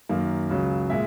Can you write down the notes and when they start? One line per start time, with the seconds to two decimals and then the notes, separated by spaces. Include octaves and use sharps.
0.09 F#2 D#3 A#3
0.50 C#2 C#3 F#3
0.90 A#2 G#3 E5